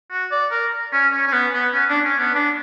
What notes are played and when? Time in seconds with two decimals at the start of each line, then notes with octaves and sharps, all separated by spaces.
0.11 F#4
0.31 D5
0.51 A#4
0.92 C#4
1.12 C#4
1.27 C#4
1.33 B3
1.53 B3
1.73 C#4
1.89 D4
2.04 C#4
2.19 B3
2.35 D4